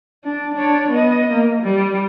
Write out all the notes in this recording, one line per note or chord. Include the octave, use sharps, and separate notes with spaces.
D4
D4 C#5
B3 D#5
A#3
G3